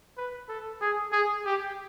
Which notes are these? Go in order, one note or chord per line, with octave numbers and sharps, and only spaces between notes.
B4
A4
G#4
G#4
G4